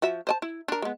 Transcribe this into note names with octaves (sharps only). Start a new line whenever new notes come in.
F3 F#4 E5
C5 D#5 A5
E4
D4 A#4
G#3 B3